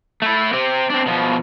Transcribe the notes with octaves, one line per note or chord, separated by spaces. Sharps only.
A3 E4
C4 G4
C4 D4
B2 F3